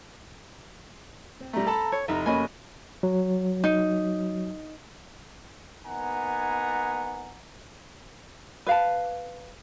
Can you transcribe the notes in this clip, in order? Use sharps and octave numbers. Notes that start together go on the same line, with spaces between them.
C4
G3 A3 A#5
A4 A5 B5
C#5
F1 D#4 E5 A#5
A#3 C#4 F#4 D#5 G#5 B5
F#3
D#4
A#3 B3 D#4 F#5 G#5 A#5
B4 F5 A5